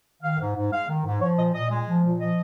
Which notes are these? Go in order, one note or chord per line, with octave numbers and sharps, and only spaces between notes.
D#3 F5
G#2
G#2
G#3 F5
D#3
G#2
F3 C#5
A#2 D#5
A#2 D#5
G#3
F3
A#2
F3 D#5